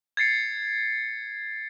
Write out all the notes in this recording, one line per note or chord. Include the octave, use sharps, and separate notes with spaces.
G#6 A6 C7 C#7